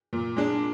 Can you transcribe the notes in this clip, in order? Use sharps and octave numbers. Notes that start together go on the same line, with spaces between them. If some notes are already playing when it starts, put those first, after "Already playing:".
A#2
G#3 D4